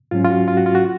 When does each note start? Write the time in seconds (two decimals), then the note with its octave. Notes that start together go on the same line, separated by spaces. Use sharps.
0.11 G#2 F#3 C#4 F4
0.24 F4
0.30 F#4
0.48 F4
0.57 F#4
0.66 F4
0.75 F#4